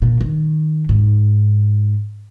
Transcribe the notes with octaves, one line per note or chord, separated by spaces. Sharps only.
A#2
D#3
G#2